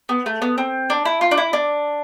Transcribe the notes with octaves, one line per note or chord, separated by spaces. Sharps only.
B3
A3
B3
C4
D4
E4
F4
D4
E4
D4